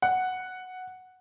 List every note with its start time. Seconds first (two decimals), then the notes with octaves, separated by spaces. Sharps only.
0.02 F#5